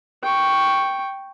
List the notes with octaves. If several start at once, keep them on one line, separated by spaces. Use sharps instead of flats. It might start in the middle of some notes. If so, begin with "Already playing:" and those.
G5 C#6